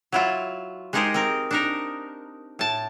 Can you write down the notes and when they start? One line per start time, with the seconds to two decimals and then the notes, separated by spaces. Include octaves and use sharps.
0.12 F#3 E4 F4
0.93 G#3 D#4 G4 G#4 A#4 C5
1.14 C4 A#4
1.51 D4 D#4 A#4
2.59 A2 A5